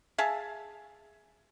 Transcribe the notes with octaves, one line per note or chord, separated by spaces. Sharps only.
G#4 E5 F5 A5